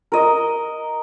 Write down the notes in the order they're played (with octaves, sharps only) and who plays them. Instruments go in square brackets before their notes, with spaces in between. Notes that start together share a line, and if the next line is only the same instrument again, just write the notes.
[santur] A#4 D#5